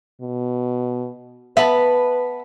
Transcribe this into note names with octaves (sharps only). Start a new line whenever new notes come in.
B2
B3 B4 E5 A5 B5